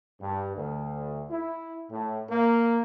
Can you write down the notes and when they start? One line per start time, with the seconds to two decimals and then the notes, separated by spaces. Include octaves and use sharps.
0.20 G2
0.55 D2
1.30 E4
1.90 A2
2.29 A#3